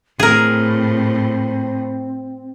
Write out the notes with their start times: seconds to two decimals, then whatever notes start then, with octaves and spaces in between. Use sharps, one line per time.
0.20 A2 C4 G#4 A#4